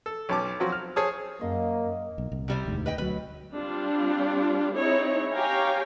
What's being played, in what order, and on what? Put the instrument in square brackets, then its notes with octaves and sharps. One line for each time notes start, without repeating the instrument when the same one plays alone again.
[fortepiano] A4
B1 C#4 A5 D6
F3 F#3 C4 F#4
F6
G#4 C5 C#5 A5 D#6
[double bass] F#2 [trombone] A#3 [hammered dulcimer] D#5
[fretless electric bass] B1
C2
[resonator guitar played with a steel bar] C3 G3 C4
[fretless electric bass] E1 D2 G#2
[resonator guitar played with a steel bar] B4 D#5 G5
[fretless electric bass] D2 F#3 [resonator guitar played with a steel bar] B4
[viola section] G3 C4 D4 F4
C4 D#4 E4 G#4 C#5
G4 C#5 F5 G5 G#5 A#5